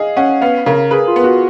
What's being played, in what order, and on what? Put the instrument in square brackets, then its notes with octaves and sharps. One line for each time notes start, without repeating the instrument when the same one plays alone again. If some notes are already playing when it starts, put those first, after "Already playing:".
Already playing: [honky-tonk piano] G#4 [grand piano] D#5 F5
[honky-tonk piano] C#4 [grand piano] F#5
[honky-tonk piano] B3 [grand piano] F5
[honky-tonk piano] C#3 [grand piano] A#4
[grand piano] G#4 [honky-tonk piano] B4
[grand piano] F4
[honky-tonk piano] B3
[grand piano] F#4